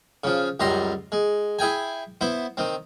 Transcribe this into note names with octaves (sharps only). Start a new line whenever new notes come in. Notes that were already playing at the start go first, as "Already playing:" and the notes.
C#3 F3
C#2 F#2 G3 A#5 C6
G#3
E4 G#4 G5 G#5
B3 E4 C5
D#3 C4